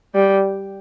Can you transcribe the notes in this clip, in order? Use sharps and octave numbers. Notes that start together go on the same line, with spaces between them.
G3